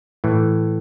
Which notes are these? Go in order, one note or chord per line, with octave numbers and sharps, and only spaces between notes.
A2 E3